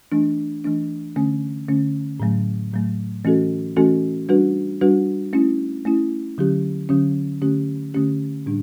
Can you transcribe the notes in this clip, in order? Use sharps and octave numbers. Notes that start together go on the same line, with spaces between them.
E3 A3 D4
E3 A3 D4
D3 A3 C#4
D3 A3 C#4
A2 F#3 A3
A2 F#3 A3
E3 A3 C#4 F#4 A4
E3 A3 C#4 F#4 A4
G3 D4 F#4 B4
G3 D4 F#4 B4
A3 C#4 E4
A3 C#4 E4
D3 F#3 C#4 G4
D3 F#3 C#4 G4
D3 A3 C#4 G4
D3 A3 C#4 G4
A2 G3 D4